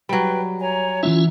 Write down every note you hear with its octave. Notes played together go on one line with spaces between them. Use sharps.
F#3 G3 B4 G5
C#5 G#5 A#5
E3 G#3 C#4 E4 F4 E5